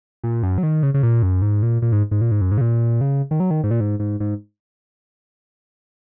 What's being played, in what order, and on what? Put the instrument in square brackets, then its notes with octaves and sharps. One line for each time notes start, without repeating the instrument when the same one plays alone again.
[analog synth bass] A#2
F#2
F#3
D#3
C#3
C#3
A#2
F#2
G#2
A#2
A#2
G#2
G#2
A#2
G#2
F#2
G#2
C#3
A#2
C#3
D#3
F#3
D#3
G#2
A#2
G#2
G#2
G#2